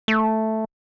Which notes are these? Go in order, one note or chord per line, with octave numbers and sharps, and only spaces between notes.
A3